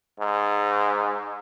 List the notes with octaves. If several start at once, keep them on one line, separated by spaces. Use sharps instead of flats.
G#2